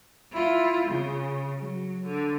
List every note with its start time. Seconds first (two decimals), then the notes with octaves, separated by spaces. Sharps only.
0.32 E4 F4
0.87 C#3
1.58 F#3
2.05 D3